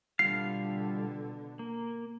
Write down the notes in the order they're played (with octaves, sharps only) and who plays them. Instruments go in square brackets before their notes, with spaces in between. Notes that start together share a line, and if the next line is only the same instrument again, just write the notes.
[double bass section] B2 D3 [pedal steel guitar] G3 F4 F5 [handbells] C7
[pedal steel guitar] A#3